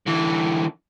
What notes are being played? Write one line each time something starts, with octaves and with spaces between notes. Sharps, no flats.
D3 E3